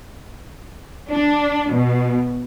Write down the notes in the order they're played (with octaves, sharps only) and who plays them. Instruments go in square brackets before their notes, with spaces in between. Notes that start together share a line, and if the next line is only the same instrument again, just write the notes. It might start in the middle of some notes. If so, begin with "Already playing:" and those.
[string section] D4
B2